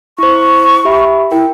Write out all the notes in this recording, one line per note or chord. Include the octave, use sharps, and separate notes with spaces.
E4 C5 C#6
G4 E5 B5
E4 A#4 G5